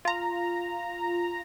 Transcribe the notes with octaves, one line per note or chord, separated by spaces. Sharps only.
F4 A#5